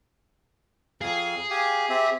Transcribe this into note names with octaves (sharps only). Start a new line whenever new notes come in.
F2 G#4 F5
G4 F5 G#5
C4 G4 E5